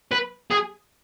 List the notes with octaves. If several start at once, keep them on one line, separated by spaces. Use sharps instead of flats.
B4
G#4